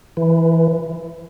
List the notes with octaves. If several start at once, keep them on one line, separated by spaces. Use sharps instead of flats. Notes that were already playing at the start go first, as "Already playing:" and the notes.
E3